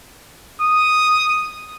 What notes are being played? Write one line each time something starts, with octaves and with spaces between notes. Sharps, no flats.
D#6